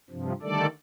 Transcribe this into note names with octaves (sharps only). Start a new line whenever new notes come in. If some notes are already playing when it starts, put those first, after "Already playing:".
G2 C3 F3
D3 D#3 G3 A3 A4 D5